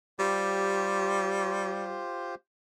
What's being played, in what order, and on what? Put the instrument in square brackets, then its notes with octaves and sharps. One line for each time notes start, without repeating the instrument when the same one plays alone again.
[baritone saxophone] G3 [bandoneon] F4 G4 C5